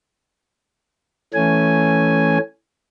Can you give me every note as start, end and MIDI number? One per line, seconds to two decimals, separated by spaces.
1.34 2.38 52
1.34 2.38 57
1.34 2.38 61
1.34 2.38 80